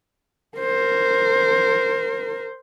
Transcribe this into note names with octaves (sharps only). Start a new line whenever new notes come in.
A#4 C5